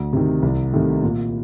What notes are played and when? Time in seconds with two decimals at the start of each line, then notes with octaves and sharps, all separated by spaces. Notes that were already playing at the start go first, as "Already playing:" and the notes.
Already playing: D2
0.13 C3 D#3
0.42 C2
0.73 C3 D#3 A3
1.03 A#2